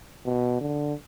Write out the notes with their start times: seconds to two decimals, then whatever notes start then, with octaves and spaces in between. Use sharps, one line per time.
0.25 B2
0.61 D3